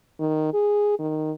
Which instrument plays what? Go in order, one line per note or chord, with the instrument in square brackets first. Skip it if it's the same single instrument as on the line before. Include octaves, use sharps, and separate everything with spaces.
[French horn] D#3
G#4
D#3